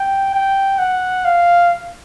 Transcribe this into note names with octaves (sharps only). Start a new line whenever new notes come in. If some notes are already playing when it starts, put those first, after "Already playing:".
Already playing: G5
G5
F#5
F5